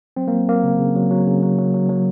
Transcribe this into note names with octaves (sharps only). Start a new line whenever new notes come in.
F#3 C4
F#3 A#3
F#3 A#3
C#3
C#3
F#3
F#3
C#3
F#3
F#3
F#3
F#3